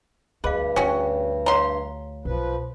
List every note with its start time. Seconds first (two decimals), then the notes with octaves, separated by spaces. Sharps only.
0.44 D2 G2 G#4 B4 D#5 F5
0.76 D2 C#4 F#4 G5
1.46 C#5 D#5 F5 A#5 C6
2.25 B1 F3 B4